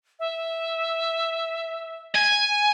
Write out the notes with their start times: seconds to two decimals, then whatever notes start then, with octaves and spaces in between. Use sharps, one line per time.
0.19 E5
2.15 G#5